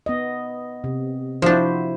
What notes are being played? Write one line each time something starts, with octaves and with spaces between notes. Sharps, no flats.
B3 D#5
C3
F3 D4 E4 F#4 C5